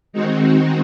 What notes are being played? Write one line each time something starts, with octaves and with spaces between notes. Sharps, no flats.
D#3 G#3 C4 D#4 F#4